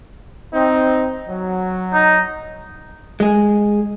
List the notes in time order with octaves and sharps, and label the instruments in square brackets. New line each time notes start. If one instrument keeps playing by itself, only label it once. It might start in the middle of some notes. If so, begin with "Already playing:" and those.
[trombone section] C4 D#4
F#3
[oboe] D#4
[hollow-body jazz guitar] G#3 G#4